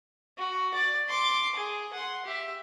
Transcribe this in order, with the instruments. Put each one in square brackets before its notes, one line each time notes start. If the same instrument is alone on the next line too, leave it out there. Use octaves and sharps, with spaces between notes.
[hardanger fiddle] F#4
D5
C6 D6
G#4
F#5 C6
G4 E5